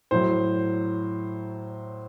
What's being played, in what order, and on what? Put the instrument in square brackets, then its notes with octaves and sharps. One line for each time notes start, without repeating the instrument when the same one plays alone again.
[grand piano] A2 F#3 C5